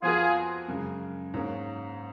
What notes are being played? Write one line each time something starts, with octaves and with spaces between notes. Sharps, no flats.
F2 F3 B3 F4 F#4 G#4 A#4
F#2 C#3 G#3
G#2 F#3 A#3 C#4